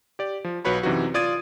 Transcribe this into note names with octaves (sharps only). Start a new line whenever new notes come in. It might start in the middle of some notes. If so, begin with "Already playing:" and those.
G4 D5
F3
B1 F#4 B4 C#5 B5
F#2 C3 E3 D#4 F#4
F4 D5 D#6 G#6 D#7